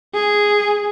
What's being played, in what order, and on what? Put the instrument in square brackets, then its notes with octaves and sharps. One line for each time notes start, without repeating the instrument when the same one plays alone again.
[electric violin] G#4